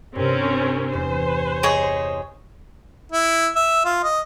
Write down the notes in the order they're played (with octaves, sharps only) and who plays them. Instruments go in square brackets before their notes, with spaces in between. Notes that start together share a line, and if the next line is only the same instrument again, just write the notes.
[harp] G2 C3 [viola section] C4 C#4 A#4
[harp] E2 [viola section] C5
[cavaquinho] G#4 C#5 D#5
[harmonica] E4
E5
F4
D#5